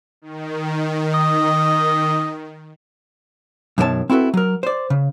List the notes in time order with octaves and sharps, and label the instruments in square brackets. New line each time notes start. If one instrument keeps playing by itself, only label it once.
[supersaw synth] D#3
[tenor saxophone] D#5
[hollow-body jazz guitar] F#2 B2 D#3 F#4 C#5 A5
C4 E4 F#4 A4 B4
F#3 A#4
C5 D5
C#3